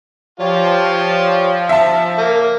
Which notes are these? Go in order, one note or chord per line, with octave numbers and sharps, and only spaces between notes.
F3 F4 G4 C#5 D5
E5 A5
C#3 A#3